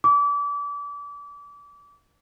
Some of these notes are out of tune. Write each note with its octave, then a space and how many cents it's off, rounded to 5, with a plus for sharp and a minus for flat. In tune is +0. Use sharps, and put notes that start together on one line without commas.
D6 -30